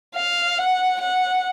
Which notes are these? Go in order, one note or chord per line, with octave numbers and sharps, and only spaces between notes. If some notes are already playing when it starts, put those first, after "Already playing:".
F5
F#5
F#5